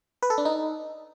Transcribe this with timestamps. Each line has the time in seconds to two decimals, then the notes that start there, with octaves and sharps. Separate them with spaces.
0.22 B4
0.30 A4
0.38 D4
0.45 D#4